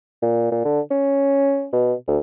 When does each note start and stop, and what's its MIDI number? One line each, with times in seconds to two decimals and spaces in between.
0.22 0.50 46
0.51 0.64 46
0.65 0.80 50
0.91 1.67 61
1.72 1.94 47
2.08 2.19 38